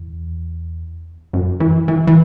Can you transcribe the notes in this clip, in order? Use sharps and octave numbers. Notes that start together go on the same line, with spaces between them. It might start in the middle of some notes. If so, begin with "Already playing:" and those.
Already playing: E2
F#2
E3
E3
E3